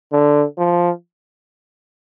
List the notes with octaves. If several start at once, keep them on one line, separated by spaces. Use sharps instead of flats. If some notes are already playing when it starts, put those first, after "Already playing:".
D3
F3